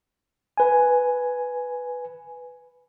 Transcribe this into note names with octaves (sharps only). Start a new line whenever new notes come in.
B4 G#5